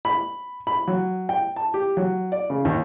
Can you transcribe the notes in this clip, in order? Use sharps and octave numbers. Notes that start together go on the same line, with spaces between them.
B5
B5
F#3
G5
A5
G4
F#3
D5
C#3
D#2